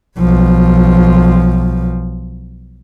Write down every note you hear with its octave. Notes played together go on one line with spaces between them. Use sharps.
B1 F3